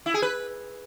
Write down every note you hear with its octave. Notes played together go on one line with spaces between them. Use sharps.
E4
G#4
B4